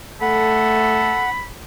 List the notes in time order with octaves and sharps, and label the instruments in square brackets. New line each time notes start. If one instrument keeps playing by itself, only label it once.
[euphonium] A3 [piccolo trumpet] A4 [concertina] F#5 [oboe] B5